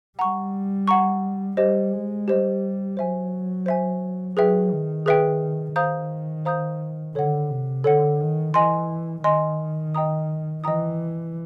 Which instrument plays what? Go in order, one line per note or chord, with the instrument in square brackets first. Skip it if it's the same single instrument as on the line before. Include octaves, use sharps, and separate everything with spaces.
[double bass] G3 [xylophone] F#5 A#5 C#6
[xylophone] F#5 A#5 C#6
[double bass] G3 [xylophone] G4 C5 D#5
[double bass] G#3
[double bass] G3 [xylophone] G4 C5 D#5
[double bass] F#3 [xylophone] C5 E5 G#5
[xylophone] C5 E5 G#5
[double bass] F#3 [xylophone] G#4 B4 E5 G5
[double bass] D#3
[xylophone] G#4 B4 E5 G5
[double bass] D#3 [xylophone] C5 F5 A#5 D#6 G6
[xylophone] C5 F5 A#5 D#6 G6
[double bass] D3 [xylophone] A4 C#5 F#5
[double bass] C3
[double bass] D3 [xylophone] A4 C#5 F#5
[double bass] D#3
[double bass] E3 [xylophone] D#5 G#5 C6
[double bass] D#3 [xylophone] D#5 G#5 C6
[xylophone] D#5 G5 A#5 D#6
[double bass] E3 [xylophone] D#5 G5 A#5 D#6